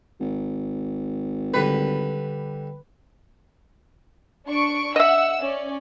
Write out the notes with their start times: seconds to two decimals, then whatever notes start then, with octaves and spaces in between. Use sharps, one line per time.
0.20 G#1
1.54 D3 G3 B4
4.47 D4 C#6 D7
4.96 D#5 E5 F#5 E6
5.40 C#4 D5